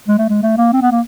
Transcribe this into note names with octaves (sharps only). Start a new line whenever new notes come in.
G#3
A3
G#3
A3
A#3
C4
B3
A#3